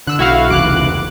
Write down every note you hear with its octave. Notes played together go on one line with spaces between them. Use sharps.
D3 E6 F#6
B1 E4 F#4 F5
F1 C#2 E3 D6 F#6